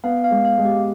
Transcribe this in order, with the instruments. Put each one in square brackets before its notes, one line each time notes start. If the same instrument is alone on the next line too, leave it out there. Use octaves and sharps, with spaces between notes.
[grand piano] B3 [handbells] F5
[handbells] F5
[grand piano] G#3
[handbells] F5
[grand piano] G#3
[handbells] G4